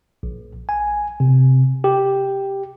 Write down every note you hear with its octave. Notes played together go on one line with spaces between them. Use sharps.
A#1
G#5
C3
G4